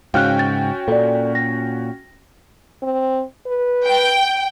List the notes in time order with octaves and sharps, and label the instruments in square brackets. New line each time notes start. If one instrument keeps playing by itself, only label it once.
[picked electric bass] G#2 C#3 [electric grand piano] C#4 F#4 G5 [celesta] F5 F6 F#6
[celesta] A6
[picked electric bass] A#2 [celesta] A4 D5
[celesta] A#6
[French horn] C4
B4
[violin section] G5